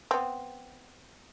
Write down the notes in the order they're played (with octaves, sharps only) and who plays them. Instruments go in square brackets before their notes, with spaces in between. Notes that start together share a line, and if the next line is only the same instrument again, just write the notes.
[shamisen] B3 C4